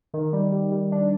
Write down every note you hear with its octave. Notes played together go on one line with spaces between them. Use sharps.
D#3
G3
G3
G3
D4